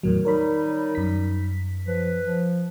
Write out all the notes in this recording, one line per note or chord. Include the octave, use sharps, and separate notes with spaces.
E2 A2 D#3 F#3
G3 D#4 A#4 C#5 B5
F#2 B6
F3 B4
F3